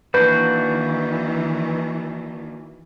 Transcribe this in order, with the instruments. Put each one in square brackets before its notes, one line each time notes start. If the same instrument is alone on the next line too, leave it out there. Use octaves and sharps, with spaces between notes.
[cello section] D#3 E3 [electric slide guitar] A#3 D4 F#4 [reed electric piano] B4 [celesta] G6